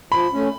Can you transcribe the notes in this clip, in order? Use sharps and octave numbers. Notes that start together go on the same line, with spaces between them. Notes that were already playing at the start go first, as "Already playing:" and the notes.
F3 B5
A3 C#4